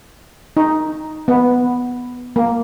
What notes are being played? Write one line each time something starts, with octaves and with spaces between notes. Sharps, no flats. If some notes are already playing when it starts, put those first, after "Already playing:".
D#4
B3
A#3